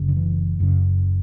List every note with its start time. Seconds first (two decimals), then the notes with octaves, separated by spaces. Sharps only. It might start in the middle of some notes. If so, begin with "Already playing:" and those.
Already playing: F#1 F#2 C#3
0.08 D3
0.17 E3
0.59 F#1 F#2 C#3